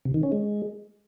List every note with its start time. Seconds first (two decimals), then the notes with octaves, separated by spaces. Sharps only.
0.05 C3
0.14 D#3
0.23 C#4
0.32 G#3